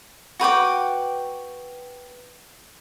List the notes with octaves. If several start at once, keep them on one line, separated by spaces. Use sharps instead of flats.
F#4 B4 G5 D6